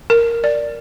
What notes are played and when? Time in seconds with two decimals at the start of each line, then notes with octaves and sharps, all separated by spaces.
0.10 A#4
0.44 D5